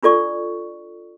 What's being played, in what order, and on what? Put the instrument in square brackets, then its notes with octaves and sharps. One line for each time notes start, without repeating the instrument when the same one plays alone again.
[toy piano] D4 F4 A4 D5 C#6